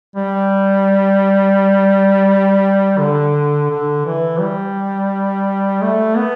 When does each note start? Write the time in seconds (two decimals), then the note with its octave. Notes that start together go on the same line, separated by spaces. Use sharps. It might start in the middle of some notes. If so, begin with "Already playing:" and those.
0.16 G3
2.99 D3
3.70 D3
4.06 E3
4.40 G3
5.82 A3
6.17 B3